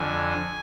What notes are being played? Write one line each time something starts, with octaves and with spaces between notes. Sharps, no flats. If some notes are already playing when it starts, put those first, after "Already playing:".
Already playing: F2 D3 G#5